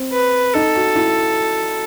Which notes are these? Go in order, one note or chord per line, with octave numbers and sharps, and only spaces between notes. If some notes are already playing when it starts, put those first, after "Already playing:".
Already playing: C4
B4
D#4 A4
F#4
E4